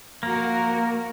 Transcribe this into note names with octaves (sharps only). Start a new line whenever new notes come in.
F3 A#3 F#4 A#4